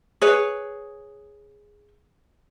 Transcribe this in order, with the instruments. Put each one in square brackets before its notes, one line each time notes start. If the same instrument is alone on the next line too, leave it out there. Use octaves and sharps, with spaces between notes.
[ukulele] G#4 B4 C#5